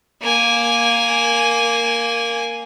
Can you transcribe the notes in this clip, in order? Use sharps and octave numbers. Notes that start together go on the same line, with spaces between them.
A#3 G#5